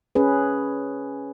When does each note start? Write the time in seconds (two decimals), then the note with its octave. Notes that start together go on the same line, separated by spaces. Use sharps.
0.15 C#4 G#4 B4